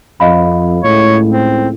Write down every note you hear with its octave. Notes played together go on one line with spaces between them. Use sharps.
F2 D#5 F5 B5
C#2 A2 C#5
C4